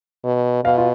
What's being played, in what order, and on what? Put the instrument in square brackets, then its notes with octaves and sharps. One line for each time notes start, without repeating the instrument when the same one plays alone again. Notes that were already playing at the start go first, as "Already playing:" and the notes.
[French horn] B2
[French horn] B2 [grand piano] F5
[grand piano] F4